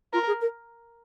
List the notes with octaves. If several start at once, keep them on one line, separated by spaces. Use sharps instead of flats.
F4 A#4
G#4
A#4